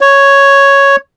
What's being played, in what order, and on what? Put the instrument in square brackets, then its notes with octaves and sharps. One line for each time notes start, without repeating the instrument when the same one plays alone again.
[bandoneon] C#5